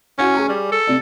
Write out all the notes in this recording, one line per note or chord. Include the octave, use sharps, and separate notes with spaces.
C#4 E4 F#4
G#4 G#5 C#6
G3
A4
C3 D5